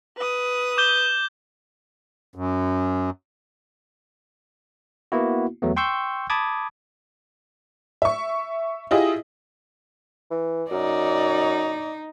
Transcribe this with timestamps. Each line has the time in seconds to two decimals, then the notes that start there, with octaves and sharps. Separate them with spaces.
0.17 B4 D#6
0.77 D6 G6 G7
2.35 F#2
5.12 A#3 B3 E4 F#4
5.62 E2 F#3 A3 B3
5.76 G5 C6 C#6 E6 G6
6.30 A5 B5 D6 D#6 G#6
8.02 E5 C#6
8.91 E4 F4 G4 G#4 D#5
10.31 E3
10.71 F#2 D#4 D5